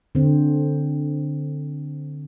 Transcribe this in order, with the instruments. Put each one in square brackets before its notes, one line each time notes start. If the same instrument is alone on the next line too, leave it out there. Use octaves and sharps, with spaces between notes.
[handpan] D3 C4